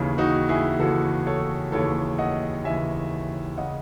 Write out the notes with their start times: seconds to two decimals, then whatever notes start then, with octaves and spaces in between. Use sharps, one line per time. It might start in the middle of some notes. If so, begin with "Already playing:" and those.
Already playing: D#2 C#3 E3
0.18 D#4 F#4
0.49 E4 G#4
0.80 D#2 C#3 E3 F#4 A4
1.27 A4 C#5
1.72 D#2 C#3 E3 A4 C#5
2.19 D#5 F#5
2.65 D#2 C#3 E3 E5 G#5
3.58 C#3 D#5 F#5